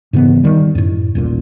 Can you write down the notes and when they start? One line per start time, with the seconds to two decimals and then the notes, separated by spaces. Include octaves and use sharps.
0.13 G#2 C#3 E3 B3
0.43 D#3 G3
0.75 F#2 A2
1.15 D#1 A1 A#2